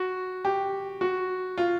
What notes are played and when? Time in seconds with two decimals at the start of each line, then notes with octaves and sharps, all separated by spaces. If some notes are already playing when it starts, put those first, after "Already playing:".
Already playing: F#4
0.45 G4
1.01 F#4
1.58 F4